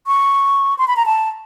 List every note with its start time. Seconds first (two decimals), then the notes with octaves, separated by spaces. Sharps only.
0.07 C#6
0.78 C6
0.88 B5
0.97 A#5
1.06 A5